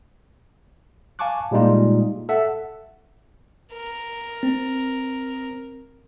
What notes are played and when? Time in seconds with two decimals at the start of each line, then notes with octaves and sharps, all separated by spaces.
1.19 F5 G#5 A5 C#6 D6 F#6
1.51 A#2 G3 G#3 A#3 D#4 F4
2.29 A4 E5 F#5
3.74 A#4
4.43 C4